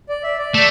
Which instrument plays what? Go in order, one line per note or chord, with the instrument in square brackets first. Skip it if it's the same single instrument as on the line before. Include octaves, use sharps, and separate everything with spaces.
[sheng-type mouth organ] D5
E5
D5
[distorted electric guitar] A3